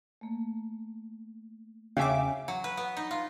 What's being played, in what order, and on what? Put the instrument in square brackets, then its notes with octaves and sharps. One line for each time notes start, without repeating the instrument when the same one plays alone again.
[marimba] A3 A#3
[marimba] E2 [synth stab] C#3 E5 D6 [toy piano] C#4 [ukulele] F5 G#5
[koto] F#3
B4
B3
D#4
F4